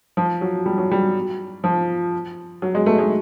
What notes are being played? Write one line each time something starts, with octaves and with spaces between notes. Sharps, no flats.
F3
F#3
G3
F#3
G3
F3
F#3
G#3
A3
G#3